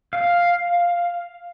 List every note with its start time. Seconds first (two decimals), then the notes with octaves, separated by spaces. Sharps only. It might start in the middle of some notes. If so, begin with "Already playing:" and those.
0.13 F5